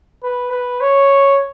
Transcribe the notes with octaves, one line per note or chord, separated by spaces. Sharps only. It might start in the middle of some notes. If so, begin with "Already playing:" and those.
B4
B4
C#5